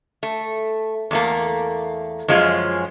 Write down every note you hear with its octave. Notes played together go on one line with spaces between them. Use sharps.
A3
E2 A3 A#3
F#2 F3 G#3 C#4 F4